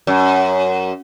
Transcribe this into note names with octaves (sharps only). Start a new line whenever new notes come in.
F#2